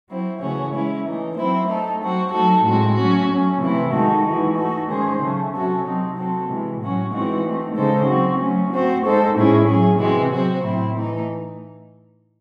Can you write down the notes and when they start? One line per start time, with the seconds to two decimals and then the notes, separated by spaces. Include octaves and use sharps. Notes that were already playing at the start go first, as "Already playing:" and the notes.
0.09 F#3 C4 E4
0.41 C#3 E3 A3 C#4 F#4
0.74 G#3 C#4 E4
1.06 E3 A3 D#4
1.37 F#3 C4 E4 C5
1.69 A3 D#4 A4
2.01 F#3 C4 F#4
2.33 F#3 A3 D#4 F#4 A4
2.65 A2 G#3 C4 F#4
2.96 F#3 A3 C#4 F#4
3.29 F#3 A3 C#4
3.61 C3 E3 A3 C4 E4
3.93 D#3 G#3 D#4 F#4 A4
4.25 E3 G#3 D#4 F#4
4.56 A3 D#4 F#4 A4
4.88 D#3 G#3 C#4 G#4 C5
5.20 C#3 F#3 A3 C#4
5.53 C3 F#3 C#4 F#4 A4
5.84 C3 F#3 C4 D#4
6.16 F#3 C4 F#4 A4
6.48 C3 E3 G#3
6.80 A2 F#3 C#4 F#4
7.12 E3 G#3 C4 D#4 F#4
7.44 A3 C4 D#4
7.76 C#3 G#3 D#4 A4 C5
8.08 F#3 C4 F#4
8.40 F#3 A3 C#4
8.72 A3 C4 F#4 C5
9.04 G#3 D#4 A4 C5
9.36 A2 G#3 C#4 E4 G#4
9.68 F#3 C#4 G#4
9.99 C3 E3 G#3 C4 F#4
10.31 F#3 C4 F#4 C5
10.63 A2 F#3 C4 E4
10.95 E3 A3 D#4